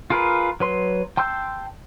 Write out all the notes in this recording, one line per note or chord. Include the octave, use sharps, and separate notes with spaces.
F4 G#4 A#4 B4
F#3 B4 C6
G5 A5 C6 E6 G6